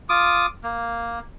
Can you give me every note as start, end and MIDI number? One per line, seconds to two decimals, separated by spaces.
0.09 0.46 65
0.09 0.46 86
0.09 0.46 87
0.64 1.19 58